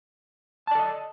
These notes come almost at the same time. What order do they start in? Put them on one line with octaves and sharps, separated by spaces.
A5 D5 A4 D#5